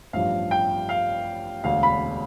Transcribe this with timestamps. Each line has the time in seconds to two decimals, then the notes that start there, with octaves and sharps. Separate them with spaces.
0.13 A1 G2 F3 F5
0.51 G5
0.89 F5
1.64 E1 D2 D3 F5
1.83 B5